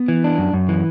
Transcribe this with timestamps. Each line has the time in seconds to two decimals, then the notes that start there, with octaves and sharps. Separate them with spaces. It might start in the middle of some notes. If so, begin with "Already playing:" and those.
Already playing: B3
0.08 E3
0.24 D4
0.38 F#2
0.53 F#2
0.68 E3